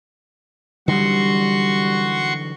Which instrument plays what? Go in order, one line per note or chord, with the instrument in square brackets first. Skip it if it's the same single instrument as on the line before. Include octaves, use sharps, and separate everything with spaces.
[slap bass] D3 E3 F#3 [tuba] G3 [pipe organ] F#4 C6 C#6